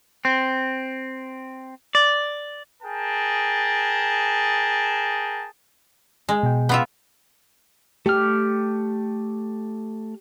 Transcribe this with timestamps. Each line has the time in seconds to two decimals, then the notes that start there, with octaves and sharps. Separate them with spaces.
0.25 C4
1.95 D5
2.83 G#4 A#4 G5 A5
6.29 G#3
6.43 B2 G5
6.69 B3 F4 E5
8.06 A3 G4 F6